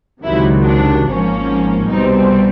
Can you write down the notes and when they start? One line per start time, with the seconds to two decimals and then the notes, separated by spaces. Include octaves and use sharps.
0.23 C#2 C3 D#3 F#3 E4
0.64 D4
1.06 G#1 G#2 F3 A#3 C#4
1.87 C2 B2 G3 C4 D#4